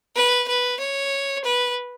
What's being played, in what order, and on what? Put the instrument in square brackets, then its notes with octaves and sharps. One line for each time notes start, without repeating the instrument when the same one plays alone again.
[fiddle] B4
B4
C#5
B4